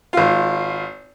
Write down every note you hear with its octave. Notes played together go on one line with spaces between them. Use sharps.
G#1 F4